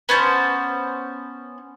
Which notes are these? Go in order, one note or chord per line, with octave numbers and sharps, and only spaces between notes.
B3 C#4 C5 A5